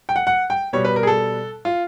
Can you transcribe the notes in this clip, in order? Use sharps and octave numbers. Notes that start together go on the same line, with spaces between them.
G5
F#5
F#5
G5
B2 G3 C#5
B4
A#4
G#4
A4
F4